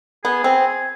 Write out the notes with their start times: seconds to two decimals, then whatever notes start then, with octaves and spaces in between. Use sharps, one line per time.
0.24 B3 G#4
0.44 C4